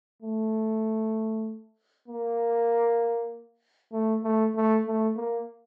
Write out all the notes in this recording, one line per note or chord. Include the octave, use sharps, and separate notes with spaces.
A3
A#3
A3
A3
A3
A3
A#3